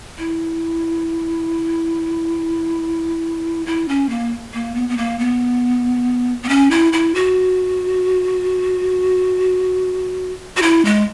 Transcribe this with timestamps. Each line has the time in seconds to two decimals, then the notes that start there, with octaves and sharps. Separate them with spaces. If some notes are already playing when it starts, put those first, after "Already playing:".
0.18 E4
3.67 E4
3.88 C#4
4.09 A#3
4.54 A#3
4.75 B3
4.89 B3
4.97 A#3
5.19 B3
6.43 B3
6.49 C#4
6.71 E4
6.93 E4
7.15 F#4
10.57 F#4
10.62 E4
10.85 G#3